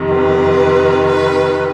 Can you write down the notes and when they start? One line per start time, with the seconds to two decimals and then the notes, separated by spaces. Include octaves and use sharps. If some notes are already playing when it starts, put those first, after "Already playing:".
Already playing: F2 C3 D#3
0.13 B4
1.06 B4